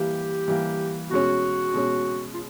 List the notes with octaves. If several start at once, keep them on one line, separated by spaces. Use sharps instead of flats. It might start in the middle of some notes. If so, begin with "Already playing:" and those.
Already playing: E3 G3 A#3 G4
E3 G3 A#3
B2 G#3 C#4 F#4
B2 G#3 C#4
F4